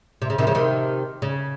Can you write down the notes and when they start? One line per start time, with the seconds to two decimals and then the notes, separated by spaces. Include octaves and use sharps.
0.22 C3
0.30 C#3
0.38 C3 D#3
0.47 C#3 F3
0.55 C3 D#3
1.22 C#3